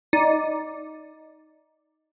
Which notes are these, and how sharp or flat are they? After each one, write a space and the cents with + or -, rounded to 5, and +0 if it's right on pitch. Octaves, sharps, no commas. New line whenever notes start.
D#4 +10 D5 +0